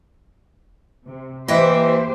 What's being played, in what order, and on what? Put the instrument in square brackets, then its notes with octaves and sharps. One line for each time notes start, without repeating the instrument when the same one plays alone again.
[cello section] C3
[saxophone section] E3 [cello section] A#3 G4 C5 [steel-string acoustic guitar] D#5 E5 G5